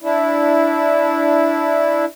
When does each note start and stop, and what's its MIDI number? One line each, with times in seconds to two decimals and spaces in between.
0.03 2.05 62
0.03 2.05 64